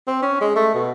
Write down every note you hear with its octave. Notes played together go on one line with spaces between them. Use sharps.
C4
C#4
G#3
A3
B2